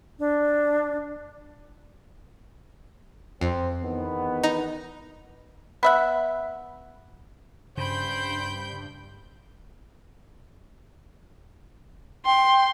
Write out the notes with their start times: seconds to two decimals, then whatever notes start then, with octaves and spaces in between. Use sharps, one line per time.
0.19 D4
3.41 F2 C4
3.82 E2 D#3 B3
4.43 D#4
5.83 B3 E5 F#5
7.77 G2 C#3 C5 G5 B5 G6
12.26 G5 C6